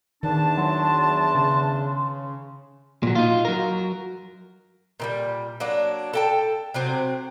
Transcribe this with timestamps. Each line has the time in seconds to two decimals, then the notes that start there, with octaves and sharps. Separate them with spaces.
0.23 E2 D#3 D4 A5
0.58 F#3 C6
1.35 C#3
3.03 A#2 F#3
3.15 D#4 F4
3.45 F#3 A#4
5.00 A#2 D#3 G3
5.60 F#3 A#3 D4
6.13 A4 G5 A5
6.74 C3 F#3 C4